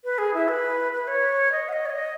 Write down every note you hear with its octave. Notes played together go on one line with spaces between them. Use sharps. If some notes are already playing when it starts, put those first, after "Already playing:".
B4
G#4
E4
B4
B4
C#5
D#5
F#5
D#5
C#5
D#5